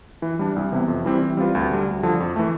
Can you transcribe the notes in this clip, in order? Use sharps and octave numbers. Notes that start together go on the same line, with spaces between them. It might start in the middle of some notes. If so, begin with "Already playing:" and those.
E3
G3 D4
C2
C3 E3 B3 E4
F2
E3 G3 C4 E4
E3
G3 C4 F4 B4
D2
D3 G3
D2
D3 F3
F2
E3 A3